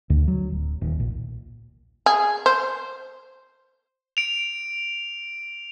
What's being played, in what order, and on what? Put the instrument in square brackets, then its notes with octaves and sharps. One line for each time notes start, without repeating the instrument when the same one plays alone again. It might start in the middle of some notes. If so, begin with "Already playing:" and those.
[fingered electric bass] D2
F#3
D1
D#1
A#1
[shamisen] G#4
C5
[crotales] D7 F7